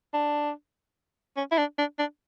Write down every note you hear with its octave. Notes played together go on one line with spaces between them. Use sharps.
D4
C#4
E4
D4
D4
D4